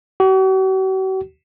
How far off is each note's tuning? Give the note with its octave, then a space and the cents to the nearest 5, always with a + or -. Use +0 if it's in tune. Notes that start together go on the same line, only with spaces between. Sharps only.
F#4 +45